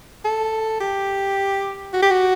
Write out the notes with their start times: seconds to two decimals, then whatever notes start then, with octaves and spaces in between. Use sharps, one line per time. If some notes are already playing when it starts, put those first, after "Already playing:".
0.25 A4
0.81 G4
1.93 F#4
2.02 G4
2.11 F#4